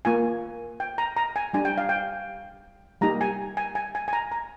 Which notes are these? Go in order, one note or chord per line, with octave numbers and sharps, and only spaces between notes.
A#3 F4 G#5
G5
A#5
A#5
G#5
G3 D4 G4 G#5
G5
F5
G5
G3 A#3 D#4 G4 A#5
G#5
G#5
G#5
G#5
G#5
A#5
A#5